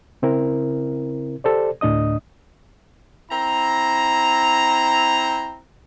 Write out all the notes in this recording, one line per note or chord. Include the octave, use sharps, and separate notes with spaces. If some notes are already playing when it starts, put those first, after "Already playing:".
C#3 C4 E4 A#4
G4 A4 C5 D5
D2 A2 D4 D#5 D#6
C4 E4 A#5